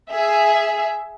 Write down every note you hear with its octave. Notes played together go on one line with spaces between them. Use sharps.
G#4 E5